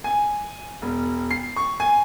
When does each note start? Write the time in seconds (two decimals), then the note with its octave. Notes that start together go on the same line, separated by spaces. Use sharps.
0.04 G#5
0.82 E1
1.31 C7
1.56 C#6
1.80 G#5